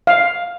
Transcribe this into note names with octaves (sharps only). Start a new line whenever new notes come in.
F5